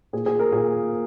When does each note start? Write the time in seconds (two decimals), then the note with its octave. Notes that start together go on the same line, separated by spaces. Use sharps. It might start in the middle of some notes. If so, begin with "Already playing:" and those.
0.13 A#2 G#4
0.26 G#4
0.39 A#4
0.52 A#2 G#4